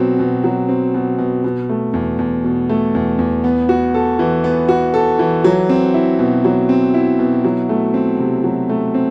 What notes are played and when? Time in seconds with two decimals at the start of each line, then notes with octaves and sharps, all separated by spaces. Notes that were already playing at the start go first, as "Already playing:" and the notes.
Already playing: B2 F#3 C4
0.19 B2
0.44 F#3
0.69 C4
0.94 B2
1.18 B2
1.44 B2
1.69 A3
1.94 E2
2.19 E2
2.44 B2
2.69 A3
2.95 E2
3.19 E2
3.44 B3
3.69 F#4
3.94 A4
4.19 E3
4.44 B3
4.69 F#4
4.94 A4
5.19 E3
5.44 F#3
5.69 C4
5.94 E4
6.19 B2
6.45 F#3
6.69 C4
6.94 E4
7.19 B2
7.44 F#3
7.69 A3
7.94 C4
8.19 C3
8.44 F#3
8.69 A3
8.94 C4